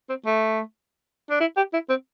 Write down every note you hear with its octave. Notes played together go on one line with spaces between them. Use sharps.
C4
A3
D4
E4
G4
E4
C4